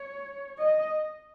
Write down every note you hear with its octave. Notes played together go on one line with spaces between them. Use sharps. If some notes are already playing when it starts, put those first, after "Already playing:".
Already playing: C#5
D#5